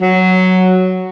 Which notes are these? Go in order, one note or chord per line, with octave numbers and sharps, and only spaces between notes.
F#3